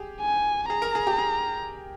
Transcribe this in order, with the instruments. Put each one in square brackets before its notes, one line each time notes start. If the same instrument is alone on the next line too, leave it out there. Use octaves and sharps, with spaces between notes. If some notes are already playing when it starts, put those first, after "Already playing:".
Already playing: [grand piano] G4 G#4
[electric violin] G#5
[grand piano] G#4 [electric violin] A#5
[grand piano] A#4
G#4
G4
G#4